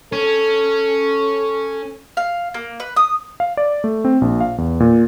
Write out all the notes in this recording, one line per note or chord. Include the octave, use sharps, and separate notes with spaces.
C#4 A4
F5
A#3
B4
D#6
F5
D5
A3
C4
A#1
F5
E2
A#2